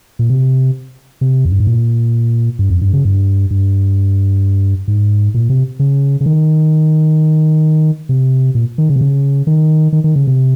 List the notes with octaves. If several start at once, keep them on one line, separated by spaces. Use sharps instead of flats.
A#2
C3
C3
F2
G2
G#2
A#2
G2
F2
G2
C#3
G2
G2
G#2
A#2
C3
C#3
C#3
D#3
C3
A#2
D#3
C#3
C3
C#3
D#3
D#3
D#3
C#3
C3